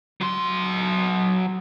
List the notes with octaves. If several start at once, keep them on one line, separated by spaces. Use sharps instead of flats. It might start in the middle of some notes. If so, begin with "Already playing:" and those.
F#3 C6